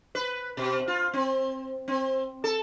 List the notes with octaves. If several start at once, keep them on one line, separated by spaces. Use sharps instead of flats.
B4
B2
F4
C4
C4
A4